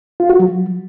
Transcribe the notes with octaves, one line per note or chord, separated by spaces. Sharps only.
F4
F#4
F#3